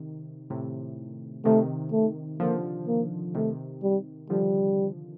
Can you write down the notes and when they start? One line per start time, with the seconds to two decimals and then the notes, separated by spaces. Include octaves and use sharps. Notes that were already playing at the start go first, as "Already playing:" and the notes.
Already playing: C3 D#3
0.50 A2 C3
1.45 C3 D#3 A3
1.92 A3
2.40 D3 F3 A#3
2.87 A#3
3.35 C3 D#3 A3
3.83 G3
4.30 D3 F3 G3